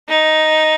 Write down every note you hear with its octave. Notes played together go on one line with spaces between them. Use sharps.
D#4